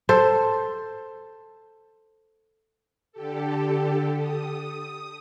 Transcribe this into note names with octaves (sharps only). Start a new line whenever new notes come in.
A4 C5
D3 G4 A4
D#6